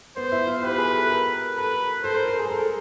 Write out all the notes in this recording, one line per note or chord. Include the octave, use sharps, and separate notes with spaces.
B3 C5
E4
F4
G4 B4
G#4
A4
A#4
A4 B4
A4 C5
A#4
A#4
G#4
A4